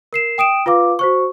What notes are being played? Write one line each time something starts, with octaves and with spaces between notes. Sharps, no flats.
A#4 C7 E7
G5 D#6 D7 E7
F4 B4 F5 D6
F#4 C5 C#6